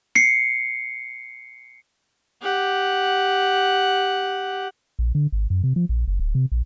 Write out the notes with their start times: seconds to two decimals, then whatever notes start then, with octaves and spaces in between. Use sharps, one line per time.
0.15 C7 C#7
2.42 G4 F#5
4.99 A#1
5.15 D3
5.32 G#1
5.50 F#2
5.64 C3
5.76 F3
5.89 A#1
6.08 F#1
6.19 D1
6.35 C3
6.52 A#1